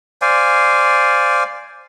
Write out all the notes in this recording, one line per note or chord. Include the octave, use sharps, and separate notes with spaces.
C5 D5 F5 G#5